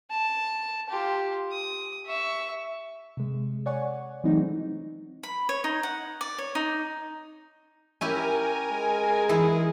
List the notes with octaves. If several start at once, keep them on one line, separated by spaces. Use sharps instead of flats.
A5
F4 G4
D#6
E5 C#6
C3 G#3
C#5 D5 F#5 G#5 C#6
E3 F#3 G#3 A3 C4 D#4
B5
C#5
D#4
F#5
D5
C#5
D#4
C#4 E4 G4 A#4 G#5
G#3
E3 E4 G#4